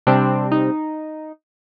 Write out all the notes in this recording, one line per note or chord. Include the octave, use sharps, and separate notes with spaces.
C3 G3 C4 D4
D#4